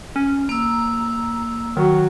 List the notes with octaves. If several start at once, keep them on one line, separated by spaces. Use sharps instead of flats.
C#4
A#3 A#5 E6
D#3 F#3